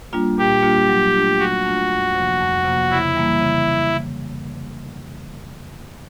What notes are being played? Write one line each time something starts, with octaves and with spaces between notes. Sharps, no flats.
G3 A#3 D4 F4
A#2 G4
G3 A#3 D4 F4
F#3
A3 D4 F4
F#3 F#4
A3 D4 F4
F2
C3 F3 A#3
F2
C3 F3 A#3
C#3 E4
E3 G3 A#3
C#3